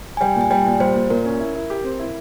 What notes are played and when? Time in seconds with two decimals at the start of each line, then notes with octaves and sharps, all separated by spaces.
0.17 G#5
0.21 G3 G5
0.36 A#2 G#5
0.51 G3 G5
0.66 A#2
0.80 G3 C5
0.95 A#2
1.10 A#2 A#4
1.25 C#4
1.40 E4
1.55 E4
1.70 G4
1.84 C4
1.99 E4